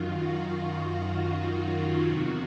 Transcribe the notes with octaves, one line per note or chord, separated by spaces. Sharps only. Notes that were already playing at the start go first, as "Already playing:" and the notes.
Already playing: F#2 D#3 F#3 F4
F#4
F#4
E2 C3 D#3 F#4